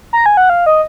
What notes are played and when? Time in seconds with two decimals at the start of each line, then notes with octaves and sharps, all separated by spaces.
0.13 A#5
0.26 G#5
0.37 F#5
0.50 F5
0.66 D#5